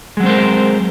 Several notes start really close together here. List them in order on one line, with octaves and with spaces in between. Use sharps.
G#3 F#3 C4 C5 A#4